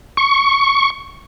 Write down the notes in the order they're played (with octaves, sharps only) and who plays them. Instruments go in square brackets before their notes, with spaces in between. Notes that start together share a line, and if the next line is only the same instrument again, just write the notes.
[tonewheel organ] C#6